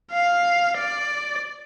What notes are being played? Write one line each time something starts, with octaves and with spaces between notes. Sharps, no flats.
F5
D5